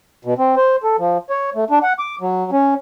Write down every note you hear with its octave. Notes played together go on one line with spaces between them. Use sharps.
B2
C4
C5
A4
F3
C#5
A3
D4
F#5
D6
F#3
C#4